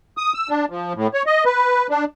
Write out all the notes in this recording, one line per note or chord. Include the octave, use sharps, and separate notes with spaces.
D#6
E6
D4
F3
A2
C#5
D#5
B4
D4